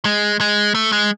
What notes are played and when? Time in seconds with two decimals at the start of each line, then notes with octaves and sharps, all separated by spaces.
0.05 G#3
0.40 G#3
0.75 A3
0.92 G#3